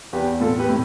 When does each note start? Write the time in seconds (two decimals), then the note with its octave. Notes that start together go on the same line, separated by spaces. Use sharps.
0.13 E2 G4 B4
0.40 A2 F4 A4
0.59 G4 B4
0.69 A2